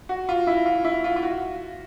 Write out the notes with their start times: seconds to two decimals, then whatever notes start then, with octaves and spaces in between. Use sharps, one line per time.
0.09 F#4
0.29 F4
0.47 E4
0.66 F4
0.85 E4
1.04 F4
1.16 F4
1.23 F#4